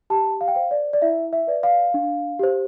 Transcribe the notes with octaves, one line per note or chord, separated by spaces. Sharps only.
G4 A5
F5
G5
C5 F5
D5
D5
E4 E5
E5
B4 D5
F5
D4
G4 C5